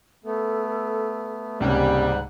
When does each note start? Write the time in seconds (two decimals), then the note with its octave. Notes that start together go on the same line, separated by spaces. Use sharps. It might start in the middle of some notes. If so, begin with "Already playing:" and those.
0.25 A3 B3 A4
1.60 C#2 G#2 C3 G3 A#3 C#4 F#5